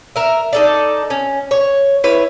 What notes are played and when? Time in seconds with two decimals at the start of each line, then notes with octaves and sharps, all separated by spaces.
0.16 A#4 E5
0.53 D#4 A4 D5
1.10 C#4
1.51 C#5
2.04 E4 B4 C#5